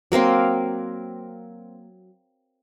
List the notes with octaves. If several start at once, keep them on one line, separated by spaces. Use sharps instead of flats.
F#3 A#3 C4 F5